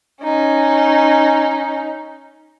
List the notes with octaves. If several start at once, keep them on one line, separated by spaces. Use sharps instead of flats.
C#4 D#4